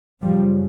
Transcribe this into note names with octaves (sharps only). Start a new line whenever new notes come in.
F#2 C#3 F3 G3